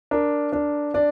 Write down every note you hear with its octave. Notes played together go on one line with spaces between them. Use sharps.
D4 A#4
D4
D4 D5